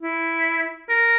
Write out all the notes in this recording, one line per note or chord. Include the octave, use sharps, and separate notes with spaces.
E4
A#4